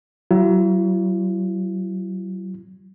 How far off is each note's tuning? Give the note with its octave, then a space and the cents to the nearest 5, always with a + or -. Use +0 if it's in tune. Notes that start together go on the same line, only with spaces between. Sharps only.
F#3 +35 E4 +45